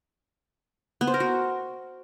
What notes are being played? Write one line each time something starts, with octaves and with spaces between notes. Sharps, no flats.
B3
C5
A#4
F#4